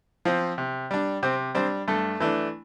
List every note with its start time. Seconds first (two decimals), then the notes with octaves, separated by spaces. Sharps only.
0.25 F3 C4
0.58 C3
0.91 G3 D4
1.23 C3 C4 C5
1.55 G3 C4 D4 C5
1.88 G2 A3 A4
2.20 E3 A3 D4